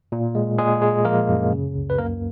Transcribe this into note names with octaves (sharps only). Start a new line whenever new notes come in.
A#2
G#3
A#2 G#3 G#4
G#3
F3 A#3 A#4
F#2
C#3
C#2
B4
F#2 A#3 A#4